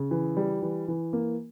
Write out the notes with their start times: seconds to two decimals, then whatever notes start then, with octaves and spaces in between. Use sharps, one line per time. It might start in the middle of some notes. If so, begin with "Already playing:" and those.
Already playing: C#3
0.11 E3
0.37 G3
0.62 E3
0.88 E3
1.13 A#3